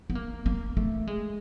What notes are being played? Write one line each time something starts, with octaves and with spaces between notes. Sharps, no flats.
B3
A#3
A#3
A3
G#3